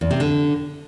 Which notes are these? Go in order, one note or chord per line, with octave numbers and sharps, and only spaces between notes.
E2
C3
D3